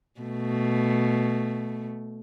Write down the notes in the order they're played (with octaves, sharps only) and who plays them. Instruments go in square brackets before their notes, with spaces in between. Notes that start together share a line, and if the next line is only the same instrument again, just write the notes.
[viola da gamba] B2 A3